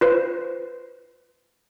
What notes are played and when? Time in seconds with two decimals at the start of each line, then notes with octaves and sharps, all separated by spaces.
0.01 F4 B4 C5